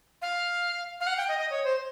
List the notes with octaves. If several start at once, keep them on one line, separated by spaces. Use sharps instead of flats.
F5
F5
F#5
G5
D#5
D#5
C#5
C5